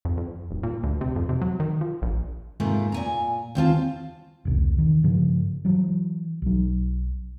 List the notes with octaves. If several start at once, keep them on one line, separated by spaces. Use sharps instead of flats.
F2
F2
D#1
A#2
D2
C3
F2
C3
F#3
D#3
F3
A#1
G#2 C3 A3 A#3 F4
A#2 G#5 A#5
D#2 C4 F4 A5
E1 C2
D#3
G2 C#3 F3
E3 F#3
B1 F#3